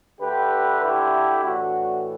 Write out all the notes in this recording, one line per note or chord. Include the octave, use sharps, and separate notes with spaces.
D3 A3 G4 B4
E4 G4
A2 E3 A3 D4 F#4